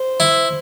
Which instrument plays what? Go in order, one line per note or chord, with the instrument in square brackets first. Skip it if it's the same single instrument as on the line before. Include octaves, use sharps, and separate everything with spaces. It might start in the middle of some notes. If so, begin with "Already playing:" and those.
Already playing: [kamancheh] C5
[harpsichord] E4